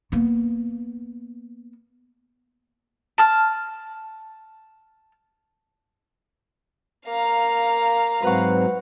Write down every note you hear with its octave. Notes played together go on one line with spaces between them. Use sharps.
A#3 B3
A5 F6
A#3 F5 A#5
G#2 F#3 C4 B4 F#5 C#6